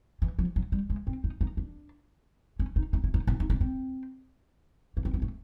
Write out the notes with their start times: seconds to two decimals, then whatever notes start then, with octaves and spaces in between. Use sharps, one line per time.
0.22 E3
0.39 F3
0.56 F#3
0.72 G3
0.90 G#3
1.07 C4
1.24 D#4
1.41 D#4
1.57 D4
2.60 C#4
2.76 D#4
2.93 D#4
3.04 E4
3.14 D#4
3.27 E4
3.40 D#4
3.50 D4
3.61 C4
4.97 A#3
5.05 C4
5.14 B3
5.22 A3